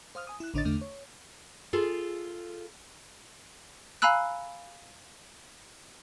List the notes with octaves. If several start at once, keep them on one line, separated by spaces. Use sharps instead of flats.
C5 F5 D#6 F6
G#5 D#6
E4 F#6
A1 D3 D4 C#5 D#5 A6
E2 D3 A3 D4
C#5
F4 G#4 A4
F5 G#5 A#5 B5 E6 F#6